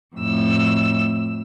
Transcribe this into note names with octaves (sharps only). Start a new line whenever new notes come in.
F2 A2 E6